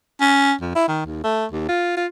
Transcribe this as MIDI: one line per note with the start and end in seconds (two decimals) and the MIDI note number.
0.21 0.53 61
0.61 0.73 41
0.75 0.87 64
0.88 1.03 51
1.06 1.20 39
1.24 1.46 57
1.51 1.65 39
1.69 1.93 65
1.97 2.07 65